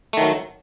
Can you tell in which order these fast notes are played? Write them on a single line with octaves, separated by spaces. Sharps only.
A3 D#3 F#3